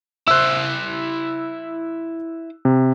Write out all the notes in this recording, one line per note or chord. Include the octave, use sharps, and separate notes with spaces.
E4 C5 E6 F#6
C3